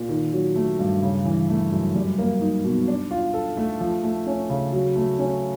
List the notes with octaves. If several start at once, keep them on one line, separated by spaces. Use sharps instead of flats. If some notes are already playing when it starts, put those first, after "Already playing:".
Already playing: A#2
D#3
F#3
A3
G2
C#3
E3
A3
F#2
G3
A#3
D#4
B2
D4
F4
A4
A3
F3
A3
C#4
C#3
F#3
A3
C#4